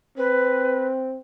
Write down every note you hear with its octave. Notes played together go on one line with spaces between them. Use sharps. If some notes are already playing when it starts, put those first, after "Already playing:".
C4 B4